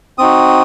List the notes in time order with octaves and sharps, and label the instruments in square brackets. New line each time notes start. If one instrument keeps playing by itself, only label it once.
[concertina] C4 D#4 F#4 D#6